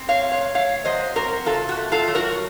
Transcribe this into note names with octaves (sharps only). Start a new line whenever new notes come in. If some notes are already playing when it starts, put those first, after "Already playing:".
Already playing: C4
C#5 F5
C3
C#5 F5
A3 C#5 F5
F#3 C5 D#5
C4 F#4 A#4
C3 F4 A4
F#4
A3
F4 A4
F#3
F#4 A#4